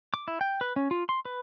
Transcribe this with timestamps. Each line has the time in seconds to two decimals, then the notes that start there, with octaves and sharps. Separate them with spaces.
0.14 D6
0.28 E4
0.41 G5
0.61 B4
0.76 C#4
0.91 F4
1.09 C6
1.25 B4